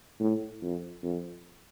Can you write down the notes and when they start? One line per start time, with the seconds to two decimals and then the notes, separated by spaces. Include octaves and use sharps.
0.20 A2
0.62 F2
1.03 F2